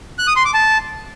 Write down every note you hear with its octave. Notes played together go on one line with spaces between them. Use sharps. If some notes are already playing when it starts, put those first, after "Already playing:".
F#6
D#6
C6
D6
A5